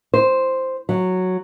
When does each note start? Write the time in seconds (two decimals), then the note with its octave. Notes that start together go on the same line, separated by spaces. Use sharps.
0.14 C5
0.89 F#3